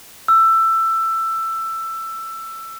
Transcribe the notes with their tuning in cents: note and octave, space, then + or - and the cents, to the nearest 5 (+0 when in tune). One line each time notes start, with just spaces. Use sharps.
E6 +15